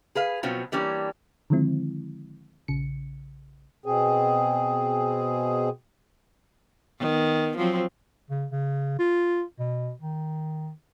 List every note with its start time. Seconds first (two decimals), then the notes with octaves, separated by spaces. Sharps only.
0.15 G#4 B4 F5
0.43 B2 F3 F#3 C4 C#4 F4
0.72 E3 G3 A#3 C#4 D4
1.50 D3 D#3 F3 G#3 C4 E4
2.68 A#1 C#3 C#7
3.86 B2 C4 G#4
7.00 D#3 B3
7.57 F3 F#3 C4
8.30 C#3
8.52 C#3
8.99 F4
9.59 B2
10.01 D#3